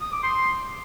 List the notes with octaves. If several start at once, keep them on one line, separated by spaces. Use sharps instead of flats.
D#6
D6
C6